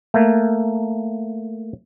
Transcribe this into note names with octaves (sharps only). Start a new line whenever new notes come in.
A3 A#3